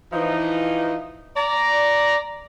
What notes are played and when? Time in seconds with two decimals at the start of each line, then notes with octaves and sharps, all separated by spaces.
0.13 E3 F3 D#4
1.37 D5 A#5